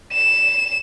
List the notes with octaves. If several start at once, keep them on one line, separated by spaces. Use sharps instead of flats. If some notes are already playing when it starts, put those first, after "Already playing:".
E7